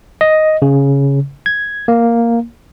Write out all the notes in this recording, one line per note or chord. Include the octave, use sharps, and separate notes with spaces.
D#5
C#3
G#6
A#3